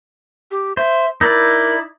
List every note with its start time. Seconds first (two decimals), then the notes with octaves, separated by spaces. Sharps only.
0.51 G4
0.77 C5 E5
1.21 D#4 E4 A#4 D5